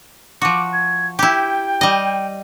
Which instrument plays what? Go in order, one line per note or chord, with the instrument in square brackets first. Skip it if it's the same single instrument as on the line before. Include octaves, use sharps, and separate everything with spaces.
[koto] F3 F#4 [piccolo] D6
[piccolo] G#6
[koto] E4 G4 [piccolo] G5
[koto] G3 D#5